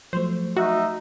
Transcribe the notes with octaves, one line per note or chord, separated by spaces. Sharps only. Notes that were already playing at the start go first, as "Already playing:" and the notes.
F3 F#3 A3 C5
D#4 F#4 E5